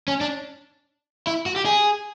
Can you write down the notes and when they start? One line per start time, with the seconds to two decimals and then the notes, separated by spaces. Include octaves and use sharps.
0.08 C#4
0.21 D4
1.27 E4
1.46 F#4
1.56 G4
1.66 G#4